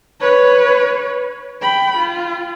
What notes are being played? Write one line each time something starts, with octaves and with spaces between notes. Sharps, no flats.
B4 C#5
G5 B5
F4